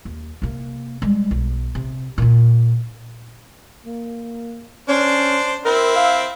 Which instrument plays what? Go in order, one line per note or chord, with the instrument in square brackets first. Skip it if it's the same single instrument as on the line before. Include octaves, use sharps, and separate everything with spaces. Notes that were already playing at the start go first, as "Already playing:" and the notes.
[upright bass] D#2
C3 A#3
G3 G#3
B1
C3
A#2 F4
[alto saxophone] A#3
[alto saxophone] C#4 [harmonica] D4 C5
[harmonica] C4 E4 [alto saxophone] A#4
[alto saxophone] F5